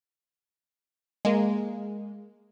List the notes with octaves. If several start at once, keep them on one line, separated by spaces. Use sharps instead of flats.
G#3 A#3